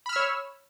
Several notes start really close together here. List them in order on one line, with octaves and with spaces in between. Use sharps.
B5 F6 E6 C#5